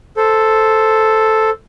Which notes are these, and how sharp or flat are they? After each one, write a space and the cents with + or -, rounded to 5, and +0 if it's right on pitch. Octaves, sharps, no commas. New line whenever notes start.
A4 +0 C5 +0